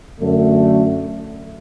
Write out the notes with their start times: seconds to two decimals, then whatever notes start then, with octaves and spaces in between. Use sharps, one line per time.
0.19 F#2 D3 A3